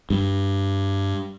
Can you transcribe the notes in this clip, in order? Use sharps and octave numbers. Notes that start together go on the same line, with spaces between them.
G2